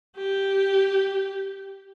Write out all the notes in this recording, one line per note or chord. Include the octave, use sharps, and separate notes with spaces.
G4